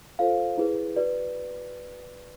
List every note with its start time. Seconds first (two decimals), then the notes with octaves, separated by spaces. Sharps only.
0.19 F4 A4 C5 F5
0.58 E4 G#4 B4
0.96 F#4 B4 D5